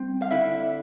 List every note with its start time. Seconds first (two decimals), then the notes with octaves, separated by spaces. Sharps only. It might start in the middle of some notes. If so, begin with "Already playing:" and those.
Already playing: G3 C4
0.22 F5
0.31 D3 E4 E5